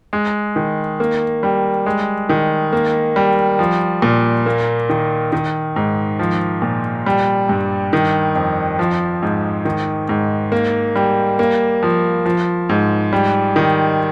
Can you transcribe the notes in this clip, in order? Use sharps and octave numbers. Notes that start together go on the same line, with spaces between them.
G#3
D#3
A#3
G3
G#3
D#3
A#3
G3
F3
A#2
A#3
D#3
D#3
G#2
F3
A#2
G3
G2
D#3
F2
F3
G#2
D#3
G#2
A#3
G3
A#3
F3
F3
G#2
G3
D#3